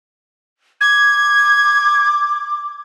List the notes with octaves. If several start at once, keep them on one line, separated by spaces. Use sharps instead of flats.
D6 G#6